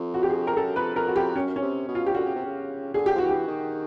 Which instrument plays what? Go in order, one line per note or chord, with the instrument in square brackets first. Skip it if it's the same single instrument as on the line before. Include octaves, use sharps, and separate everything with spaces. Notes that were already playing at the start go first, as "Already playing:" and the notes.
Already playing: [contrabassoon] F2
[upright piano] F#4
G4
G#4
A#4
[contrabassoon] F#2 [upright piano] A4
[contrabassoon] F2 [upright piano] B4
[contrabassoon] F2 [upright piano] A#4
[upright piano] F#4
[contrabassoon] F2 [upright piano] G4
[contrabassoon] F#2 [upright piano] C#4
[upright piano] C#4
[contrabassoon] C3
B2
[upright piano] F4
G4
[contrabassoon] D3 [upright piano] F#4
[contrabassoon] C#3
C3
C#3
[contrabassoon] D3 [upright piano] G#4
[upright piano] G4
[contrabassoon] F3
[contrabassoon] E3 [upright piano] F#4
[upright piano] G4
[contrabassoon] D#3